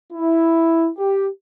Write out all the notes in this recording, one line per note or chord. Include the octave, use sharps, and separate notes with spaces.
E4
G4